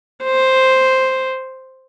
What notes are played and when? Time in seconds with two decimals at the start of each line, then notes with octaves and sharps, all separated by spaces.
0.24 C5